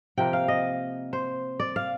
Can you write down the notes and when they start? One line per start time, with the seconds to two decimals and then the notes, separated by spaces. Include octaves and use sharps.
0.17 C3 F3 A#3 G5
0.33 F5
0.48 D#5
1.13 C5
1.60 D5
1.76 F5